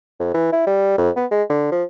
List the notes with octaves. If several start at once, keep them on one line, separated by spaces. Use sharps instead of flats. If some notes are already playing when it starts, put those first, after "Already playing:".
F2
E3
E4
G3
F2
B3
G#3
D3
F3